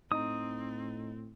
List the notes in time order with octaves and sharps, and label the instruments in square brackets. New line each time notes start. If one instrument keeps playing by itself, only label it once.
[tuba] A2 [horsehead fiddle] C4 [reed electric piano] D#4 D#5 A#5 [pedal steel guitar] D#6